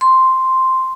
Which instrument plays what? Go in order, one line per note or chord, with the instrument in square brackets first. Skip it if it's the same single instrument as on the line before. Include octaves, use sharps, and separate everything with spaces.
[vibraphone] C6